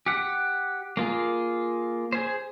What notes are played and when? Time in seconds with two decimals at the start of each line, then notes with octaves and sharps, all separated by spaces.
0.06 G4 F#5
0.97 A#3 F4 G#4
2.12 G#4 C5